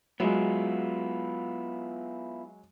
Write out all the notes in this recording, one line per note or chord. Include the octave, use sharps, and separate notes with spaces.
F#3 G#3 B3 E4 F4